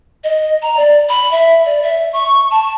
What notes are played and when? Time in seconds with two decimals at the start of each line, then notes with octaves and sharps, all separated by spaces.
0.24 D#5
0.62 A#5
0.77 D5
1.09 B5
1.31 E5
1.66 D5
1.83 E5
2.13 C#6
2.51 A5